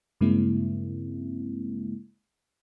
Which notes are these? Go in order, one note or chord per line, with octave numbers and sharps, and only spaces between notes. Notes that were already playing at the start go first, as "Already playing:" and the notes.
G2 C#3 G#3 A#3 C4 E4